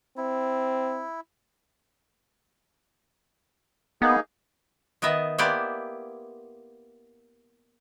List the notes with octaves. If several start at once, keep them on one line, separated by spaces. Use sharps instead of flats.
C4 E4
A#3 B3 D#4 G#4
D#3 B3 D#5 E5
A#3 B3 E4 G4 C5 D5